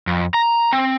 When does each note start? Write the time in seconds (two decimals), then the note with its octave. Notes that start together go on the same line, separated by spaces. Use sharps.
0.07 F2
0.34 A#5
0.73 C4